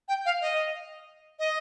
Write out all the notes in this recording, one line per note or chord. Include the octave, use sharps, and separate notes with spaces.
G5
F5
D#5
D#5